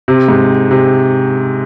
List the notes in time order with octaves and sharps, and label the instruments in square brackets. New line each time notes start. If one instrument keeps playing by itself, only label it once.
[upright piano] C3
G#2
C3